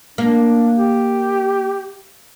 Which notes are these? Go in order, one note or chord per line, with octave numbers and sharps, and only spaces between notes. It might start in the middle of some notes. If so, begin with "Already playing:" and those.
A#3 D4
G4